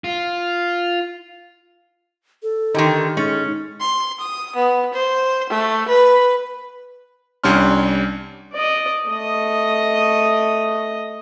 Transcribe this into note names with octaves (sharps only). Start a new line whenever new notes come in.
F4
A4
D3 D#3 D#4 G4
G#3 C#4 D#4 A6
C6
D#6
B3
C5
A3
B4
C2 G3 C#4 D4 C6 F6
D5 D#5
A3 D#5